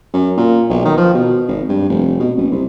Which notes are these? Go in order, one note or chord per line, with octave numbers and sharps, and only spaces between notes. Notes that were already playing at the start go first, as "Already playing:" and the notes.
F#2
A#2
B1
D#3
F3
B2
G#1
G2
F1
B2
F#1
C2